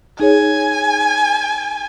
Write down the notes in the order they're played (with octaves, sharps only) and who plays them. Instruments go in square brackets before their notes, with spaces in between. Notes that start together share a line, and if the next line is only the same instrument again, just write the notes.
[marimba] D#4 G#4 C#5 [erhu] G#5